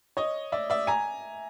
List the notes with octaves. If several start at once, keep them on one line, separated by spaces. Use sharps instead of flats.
C#5 D#5
D5 E5
D5 E5
G#5 A#5